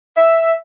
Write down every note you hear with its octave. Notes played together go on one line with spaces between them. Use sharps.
E5